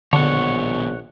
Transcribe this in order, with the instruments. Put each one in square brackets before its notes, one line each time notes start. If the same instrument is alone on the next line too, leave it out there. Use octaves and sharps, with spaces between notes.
[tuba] A#1 [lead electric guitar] D#2 B2 [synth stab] D3 [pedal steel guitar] C#5 F#5